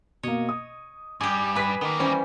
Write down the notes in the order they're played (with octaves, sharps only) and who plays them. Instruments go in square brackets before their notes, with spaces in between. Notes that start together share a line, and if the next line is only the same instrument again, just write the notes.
[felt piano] B2 A#3 [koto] C#5 D#5
[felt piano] D#6
[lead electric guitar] G2 [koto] G4 G#4
[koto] G#4 B4 [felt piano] B5 B6
[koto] D#3 [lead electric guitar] A#3 B3
[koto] E3 G3 C#4 [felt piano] C5 G#5